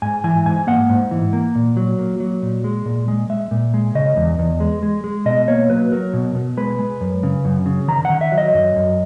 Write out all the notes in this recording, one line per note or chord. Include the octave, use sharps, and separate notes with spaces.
G#2 G#5
E3 G#5
G#2 G#5
A#3 F#5
G#2
E3
A#3
A#2
F#3
A#3
F#3
A#2
G#3
A#2
G#3
G#3 E5
A#2
G#3
C#3 D#5
E2
E2
G#3
G#3
G#3
B2 D#5
A#3 C#5
F#3 B4
F#3 A#4
B2
B2
G#3 B4
G#3
F#2
C#3
F#2
C#3
D#3 A#5
D#3 F#5
E5
F#3
D#5
F#2
F#2